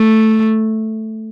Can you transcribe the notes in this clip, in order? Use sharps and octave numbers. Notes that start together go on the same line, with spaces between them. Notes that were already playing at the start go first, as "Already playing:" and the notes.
Already playing: A3